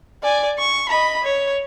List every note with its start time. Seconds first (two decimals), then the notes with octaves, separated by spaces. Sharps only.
0.23 D5 G#5
0.59 C#6
0.89 D#5 B5
1.23 C#5